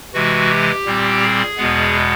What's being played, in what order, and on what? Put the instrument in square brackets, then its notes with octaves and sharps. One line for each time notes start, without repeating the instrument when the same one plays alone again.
[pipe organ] C3 E3 G#3 F#4
G4
A#2 G3 C4
G#4
E2 B2 G#3 B3